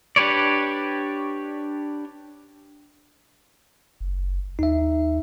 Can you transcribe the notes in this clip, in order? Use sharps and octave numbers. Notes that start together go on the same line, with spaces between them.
D4 G4 B4 C#5 D5
F#1
D#2 D#4 E5